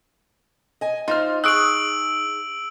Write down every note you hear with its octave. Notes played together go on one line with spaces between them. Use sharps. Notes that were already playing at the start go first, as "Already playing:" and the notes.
D#5 G#5
D#4 F4 C5 F6
G#4 C#6 E6 F#6 D7 F#7